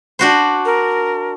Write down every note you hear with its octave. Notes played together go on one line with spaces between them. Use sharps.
D4 F#4 C5
A#4